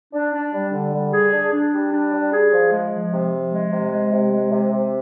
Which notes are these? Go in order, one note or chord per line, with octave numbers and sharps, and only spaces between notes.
D4
D4
G3
D3
G3
G#4
D4
D4
G3
D4
G3
G#4
F3
G#3
F3
C3
F3
G#3
C3
G#3
C3
G#3
C3
C3